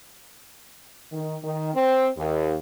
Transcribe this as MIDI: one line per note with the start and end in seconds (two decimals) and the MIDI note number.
1.13 1.36 51
1.43 1.72 51
1.74 2.07 60
2.17 2.54 39